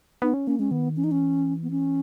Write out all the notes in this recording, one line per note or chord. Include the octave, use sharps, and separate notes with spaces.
B3 D#4
C#4
A#3 C#4
G#3 C#4
D#3 B3
E3 C#4
D#4
C#4
B3
C#4